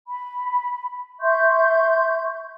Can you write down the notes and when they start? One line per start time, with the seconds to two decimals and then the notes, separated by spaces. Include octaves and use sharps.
0.07 B5
1.20 E5 C6 C#6 G6